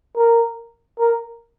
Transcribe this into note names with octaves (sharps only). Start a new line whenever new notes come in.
A#4
A#4